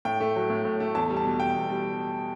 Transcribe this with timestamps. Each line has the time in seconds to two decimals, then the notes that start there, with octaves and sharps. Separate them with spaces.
0.05 A2 G5
0.20 A3
0.36 F#3
0.50 A2
0.65 A2
0.80 A3
0.95 E2 A5
1.10 G3
1.17 A5
1.25 B2
1.40 E2 G5
1.55 E2
1.70 G3